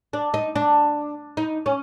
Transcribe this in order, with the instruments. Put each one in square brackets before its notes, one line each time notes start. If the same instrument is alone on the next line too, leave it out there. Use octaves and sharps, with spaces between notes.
[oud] D4
D#4
D4
D#4
C#4